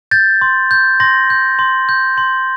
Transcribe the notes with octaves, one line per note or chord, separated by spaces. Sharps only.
G6 A6
C6
G6
C6 A#6
G6
C6
G6
C6